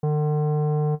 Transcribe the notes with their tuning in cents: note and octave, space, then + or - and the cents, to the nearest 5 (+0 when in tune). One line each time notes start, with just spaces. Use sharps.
D3 +45